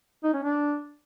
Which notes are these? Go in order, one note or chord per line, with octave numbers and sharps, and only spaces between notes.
D#4
C#4
D4